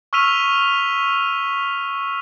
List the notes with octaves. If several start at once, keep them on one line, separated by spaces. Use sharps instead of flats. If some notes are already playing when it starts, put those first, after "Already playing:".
C#6 E6 F6 B6 D#7 F7